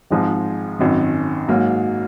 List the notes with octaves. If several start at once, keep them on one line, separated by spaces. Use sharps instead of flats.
G#1 G#2 F3 G#3 D#4
G#1 F#2 D#3
G#2 F#3 A#3